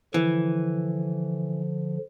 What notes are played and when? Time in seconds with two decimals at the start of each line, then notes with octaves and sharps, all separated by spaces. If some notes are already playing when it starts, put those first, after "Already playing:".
0.14 D3 E3 F3